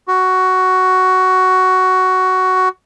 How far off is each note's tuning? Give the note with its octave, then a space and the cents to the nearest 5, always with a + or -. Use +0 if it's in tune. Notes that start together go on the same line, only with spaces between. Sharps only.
F#4 +10